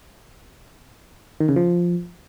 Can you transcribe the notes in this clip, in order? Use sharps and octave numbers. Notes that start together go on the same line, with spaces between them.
D#3
C#3
F3